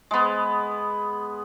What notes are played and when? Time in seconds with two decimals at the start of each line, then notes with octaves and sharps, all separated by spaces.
0.11 G#3 B3